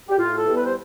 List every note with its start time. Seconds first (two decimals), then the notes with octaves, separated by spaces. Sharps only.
0.09 G4
0.18 A2 F4
0.36 A4
0.45 E3 G3 B3
0.55 B4
0.64 C5